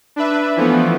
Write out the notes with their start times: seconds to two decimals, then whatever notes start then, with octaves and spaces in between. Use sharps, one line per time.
0.16 D4 B4 E5
0.56 E3 F3 A3 B3